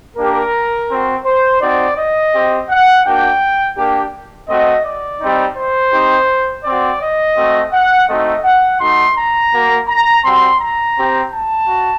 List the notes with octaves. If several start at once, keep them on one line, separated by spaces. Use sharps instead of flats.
A#3 D4 G4 A#4
C4 F#4
C5
C4 D#4 F#4 D5
D#5
C4 G4
F#5
A#3 D4 F#4 G5
A#3 D4 G4
A3 C4 F#4 D#5
D5
G3 C4 D#4
C5
C4 D#4 G4
C4 F#4 D5
D#5
A3 C4 F#4
F#5
A3 C4 D#4 F#4 D#5
F#5
A3 D#4 F#4 C6
A#5
A#3 F#4
A#5
G3 C4 F#4 C6
A#5
C4 G4
A5
F#4